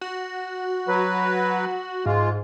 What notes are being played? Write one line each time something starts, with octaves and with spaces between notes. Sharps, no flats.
F#4
F#3 B4
G#2 G#3 F4